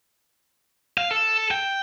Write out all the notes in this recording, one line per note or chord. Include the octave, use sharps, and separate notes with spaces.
F5
A4
G5